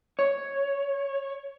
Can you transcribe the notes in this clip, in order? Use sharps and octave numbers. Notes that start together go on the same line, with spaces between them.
C#5